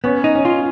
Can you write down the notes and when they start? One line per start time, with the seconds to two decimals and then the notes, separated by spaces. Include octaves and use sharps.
0.04 B3 C#4
0.24 D#4
0.35 C#4
0.45 F4